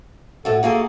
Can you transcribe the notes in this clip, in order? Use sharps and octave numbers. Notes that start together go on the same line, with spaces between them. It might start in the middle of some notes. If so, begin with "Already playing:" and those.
A2 F#4 A4
A#3 F#4 G#4 A4